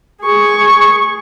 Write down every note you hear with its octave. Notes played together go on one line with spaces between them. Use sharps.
G#4 C#6